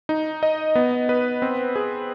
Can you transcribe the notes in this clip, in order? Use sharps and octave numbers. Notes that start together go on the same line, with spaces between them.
D#4
D#5
B3
B4
C4
G#4